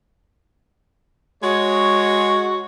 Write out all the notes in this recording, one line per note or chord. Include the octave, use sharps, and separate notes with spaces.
G#3 F#4 C#5